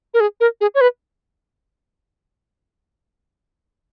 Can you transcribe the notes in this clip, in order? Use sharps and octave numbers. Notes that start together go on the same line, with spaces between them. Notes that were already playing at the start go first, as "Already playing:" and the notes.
A#4
G#4
A#4
G#4
C#5
B4